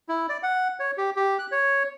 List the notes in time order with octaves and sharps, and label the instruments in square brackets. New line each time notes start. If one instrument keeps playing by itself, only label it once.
[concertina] E4
D5
F#5
C#5
G4
G4
F#6
C#5